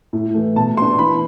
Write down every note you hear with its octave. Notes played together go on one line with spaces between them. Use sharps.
A2
E3 A3
B2 A5
B3 D4 C6
E3 B5